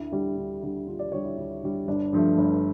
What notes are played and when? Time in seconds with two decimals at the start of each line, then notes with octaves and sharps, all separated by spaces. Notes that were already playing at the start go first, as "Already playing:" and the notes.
Already playing: D2 E4
0.11 D3 G3
0.37 D2
0.62 D3 G3
0.87 D2 F4
0.99 D5
1.12 D3 G3 C#5
1.24 E4
1.38 D2
1.63 D3 G3
1.88 G1 D4
2.13 G2 F3 A3
2.38 G1